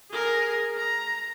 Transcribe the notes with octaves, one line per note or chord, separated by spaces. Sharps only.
G#4 A#4
A#5